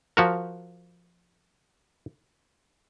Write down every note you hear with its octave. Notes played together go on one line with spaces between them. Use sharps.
F3 F#4 A#4